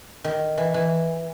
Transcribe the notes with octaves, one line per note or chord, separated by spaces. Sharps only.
D#3
E3
E3